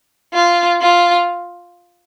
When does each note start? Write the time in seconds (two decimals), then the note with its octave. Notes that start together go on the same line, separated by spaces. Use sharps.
0.33 F4
0.81 F4